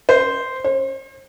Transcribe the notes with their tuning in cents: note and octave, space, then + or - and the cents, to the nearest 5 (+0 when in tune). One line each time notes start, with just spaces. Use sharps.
C5 -10
C5 +40